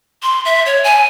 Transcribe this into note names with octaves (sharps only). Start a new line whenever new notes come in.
C6
E5
C#5
G#5